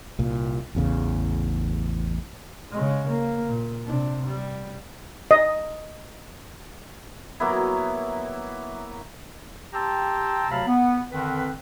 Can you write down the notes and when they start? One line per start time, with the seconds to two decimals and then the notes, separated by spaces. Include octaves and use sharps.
0.19 C2 A#2
0.75 A1 E2 C#3
2.72 C#3 G#3
3.09 A#3
3.48 A#2
3.86 C3 D4
4.26 G3
5.31 D#5
7.40 F#3 A#3 B3 E4
9.73 G4 G5 A5 A#5 C6 E6
10.50 D2 C3 F#3 F5 A5 B5
10.66 B3
11.11 F2 D3 D#3 C4 B4